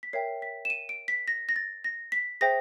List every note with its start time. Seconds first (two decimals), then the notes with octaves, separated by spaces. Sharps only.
0.03 B6
0.13 A#4 C#5 E5 G5 C7
0.42 B6
0.65 E7
0.70 D#7
0.89 D7
1.08 B6
1.28 A#6
1.49 A#6
1.56 A6
1.84 A#6
2.12 B6
2.41 G#4 C5 E5 G5 A#6